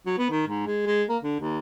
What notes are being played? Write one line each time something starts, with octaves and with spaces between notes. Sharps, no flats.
F#3
B3
D#3
G#2
G#3
G#3
A#3
D3
D#2